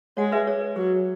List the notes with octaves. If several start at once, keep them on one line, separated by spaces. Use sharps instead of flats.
G#3 C#5 F#5
B4 E5
G#4 C#5
B4
F#3 G#4